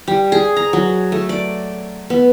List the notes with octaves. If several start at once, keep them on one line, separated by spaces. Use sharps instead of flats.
G3
G#4
A#5
F#3
A3
D5
B3